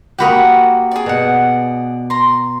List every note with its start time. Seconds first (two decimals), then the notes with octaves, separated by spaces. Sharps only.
0.18 A#3 F#4 G4 F#5 B5 D#6
0.91 G#4 D5
1.06 B2 F#5
2.10 A#5 C6